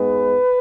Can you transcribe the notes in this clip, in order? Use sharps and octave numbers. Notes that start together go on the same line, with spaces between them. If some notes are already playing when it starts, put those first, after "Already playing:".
Already playing: G#2 G#3 B3 B4